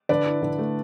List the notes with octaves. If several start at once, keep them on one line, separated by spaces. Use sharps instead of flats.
D3 B4 D5
E4
D3
A3